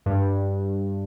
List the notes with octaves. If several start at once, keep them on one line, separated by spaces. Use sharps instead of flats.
G2